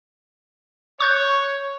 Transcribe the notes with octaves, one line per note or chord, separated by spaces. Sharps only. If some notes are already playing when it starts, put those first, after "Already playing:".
C#5 C#6 F#6 G6